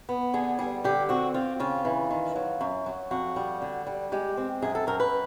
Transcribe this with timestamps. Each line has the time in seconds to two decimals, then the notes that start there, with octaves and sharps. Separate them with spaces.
0.09 B3
0.34 D3 G#4
0.59 G3 G#4
0.84 D3 G4
1.09 C4 F#4
1.34 C4 F4
1.60 C#3 F4
1.85 E3
2.11 D#3
2.35 F#3
2.61 F#2
2.86 F#3
3.11 F2 F#4
3.36 G3
3.62 D3
3.87 G3
4.12 G#3 G4
4.37 C4
4.62 F#2 G#4
4.75 A4
4.87 F#2 A#4
5.00 B4